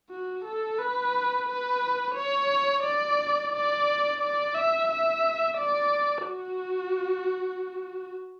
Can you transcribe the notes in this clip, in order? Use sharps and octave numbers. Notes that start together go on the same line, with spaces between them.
F#4
A4
B4
B4
C#5
D5
D5
D5
E5
E5
D5
F#4